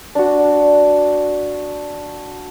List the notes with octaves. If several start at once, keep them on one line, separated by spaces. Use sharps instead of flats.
D4 F#4